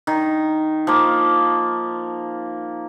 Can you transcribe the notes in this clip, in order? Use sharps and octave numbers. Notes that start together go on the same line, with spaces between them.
D#3
F3 A#3